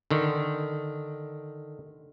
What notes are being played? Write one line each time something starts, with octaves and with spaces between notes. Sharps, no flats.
D3 D#3